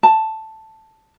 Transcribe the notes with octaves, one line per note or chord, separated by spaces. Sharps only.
A5